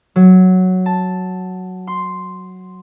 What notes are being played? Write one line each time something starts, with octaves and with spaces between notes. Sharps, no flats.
F#3
A5
C6